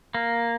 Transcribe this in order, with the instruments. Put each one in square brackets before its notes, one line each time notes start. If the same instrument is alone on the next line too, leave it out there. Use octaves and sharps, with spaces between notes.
[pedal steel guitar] A#3